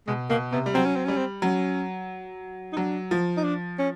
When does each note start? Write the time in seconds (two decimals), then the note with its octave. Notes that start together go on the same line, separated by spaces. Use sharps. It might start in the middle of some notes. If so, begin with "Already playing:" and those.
0.07 B2 G#3
0.30 B2 A#3
0.52 C3 B3
0.66 G3
0.74 F#3 C4
0.85 C#4
0.96 C4
1.05 G3 C#4
1.17 C4
1.42 F#3 C#4
2.73 D#4
2.77 F#3 D4
3.11 F3
3.37 D#4
3.44 D4
3.79 C#4